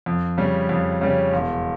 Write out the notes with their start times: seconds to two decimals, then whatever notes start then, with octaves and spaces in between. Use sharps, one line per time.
0.06 F2
0.38 C#3 G3 C#4
0.69 F2
1.01 C#3 G3 C#4
1.33 E1